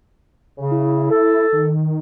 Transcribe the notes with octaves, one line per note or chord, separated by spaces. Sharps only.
C#3
E4
A4
D#3